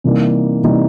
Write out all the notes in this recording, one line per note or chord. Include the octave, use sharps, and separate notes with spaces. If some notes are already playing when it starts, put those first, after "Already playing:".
C3 E3 G3 A#3 D#4
C3 E3 G3 A#3 D#4